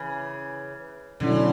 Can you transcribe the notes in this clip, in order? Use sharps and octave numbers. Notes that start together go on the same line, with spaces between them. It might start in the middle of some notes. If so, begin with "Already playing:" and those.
Already playing: C#3 E3
B2 D3 F#3 C#4 E4